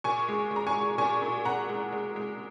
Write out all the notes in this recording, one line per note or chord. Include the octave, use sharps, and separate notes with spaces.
A#2 G#5 C#6
G#3
G#3
A#5
G#5 C#6
G#3
A#2 G#5 C#6
A#2
A#2 F#5 A#5
G#3
G#3
G#3